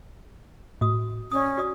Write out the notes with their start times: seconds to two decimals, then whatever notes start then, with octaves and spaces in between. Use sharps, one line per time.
0.81 A2 F#4 D#6
1.31 C#4 D5 D#6
1.57 F#4 D5 D#6